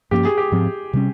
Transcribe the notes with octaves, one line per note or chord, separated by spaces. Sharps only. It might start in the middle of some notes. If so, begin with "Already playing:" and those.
G2 F3 A#3 C#4 G4
G#4
G4
G#2 F3 C4
C3 G3 C#4